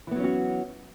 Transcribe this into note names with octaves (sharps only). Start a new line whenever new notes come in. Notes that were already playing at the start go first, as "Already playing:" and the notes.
E3 F#3 B3 C#4 F#4